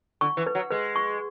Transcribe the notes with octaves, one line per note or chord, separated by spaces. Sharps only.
D3 C#6
E3
B4
F#3
G#3 B4
C#6